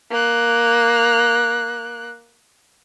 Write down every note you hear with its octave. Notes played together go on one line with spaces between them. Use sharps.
A#3 F#6